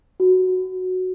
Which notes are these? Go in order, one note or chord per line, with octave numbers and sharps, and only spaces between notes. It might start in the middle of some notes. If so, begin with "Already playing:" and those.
F#4